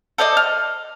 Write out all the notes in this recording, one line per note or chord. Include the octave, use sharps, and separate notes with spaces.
A4 C5 D5 D#5
F6